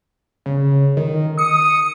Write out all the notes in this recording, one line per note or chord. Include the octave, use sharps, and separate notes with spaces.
C#3
D#3
D#6 C#7